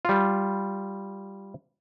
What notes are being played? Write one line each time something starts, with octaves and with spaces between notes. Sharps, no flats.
G3 F4